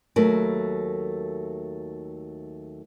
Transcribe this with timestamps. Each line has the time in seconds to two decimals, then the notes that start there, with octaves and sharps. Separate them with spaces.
0.16 D#2 F#3 A3 A#4 B4